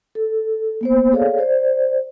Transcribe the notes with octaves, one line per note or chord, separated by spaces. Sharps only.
A4
A#3 B3 C5
G#4 A4 C#5 D5 F5
C5 D5